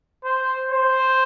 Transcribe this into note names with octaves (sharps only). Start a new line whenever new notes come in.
C5
C5